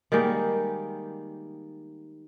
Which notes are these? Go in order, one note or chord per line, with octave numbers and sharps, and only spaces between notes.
D#3 G3 G#3 A#3